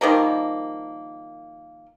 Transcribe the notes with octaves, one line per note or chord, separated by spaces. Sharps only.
D#3 F3 G3 A#3